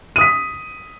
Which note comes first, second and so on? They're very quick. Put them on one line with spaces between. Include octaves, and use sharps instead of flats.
D#7 D#6 B6